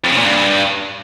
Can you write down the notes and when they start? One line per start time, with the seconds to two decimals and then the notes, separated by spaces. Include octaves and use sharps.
0.04 F2
0.11 C#3
0.18 A#2
0.24 G2